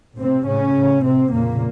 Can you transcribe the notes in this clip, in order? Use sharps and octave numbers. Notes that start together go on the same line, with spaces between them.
A2 C3 C4
A2 C#3 C#4
A2
A2 C3 C4
F2 A#2 C#3 A#3